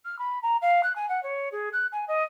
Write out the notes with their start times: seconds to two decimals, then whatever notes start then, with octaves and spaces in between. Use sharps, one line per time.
0.05 F6
0.18 B5
0.42 A#5
0.61 F5
0.83 F#6
0.95 G#5
1.08 F#5
1.23 C#5
1.52 G#4
1.72 F#6
1.92 G#5
2.07 D#5